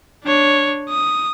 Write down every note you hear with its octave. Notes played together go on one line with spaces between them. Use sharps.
D4 C#5
D#6